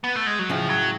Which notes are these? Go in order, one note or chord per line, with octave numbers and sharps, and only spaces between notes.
B3
A3
G#3
F#3
A2 C#3 F3
F#3